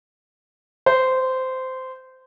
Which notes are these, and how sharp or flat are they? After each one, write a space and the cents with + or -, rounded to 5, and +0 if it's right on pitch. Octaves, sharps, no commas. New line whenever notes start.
C5 -15